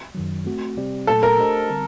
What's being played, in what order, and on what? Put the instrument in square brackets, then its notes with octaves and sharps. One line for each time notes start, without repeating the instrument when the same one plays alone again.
[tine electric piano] F#2 D#3 F#3
A3 C4 F#4
C3 G3 C4 G4 D5
[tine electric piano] A#2 F#3 A3 [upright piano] A4
[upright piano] A#4
[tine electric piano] A3 D4 G4 C5 D#5
D3 G3 C4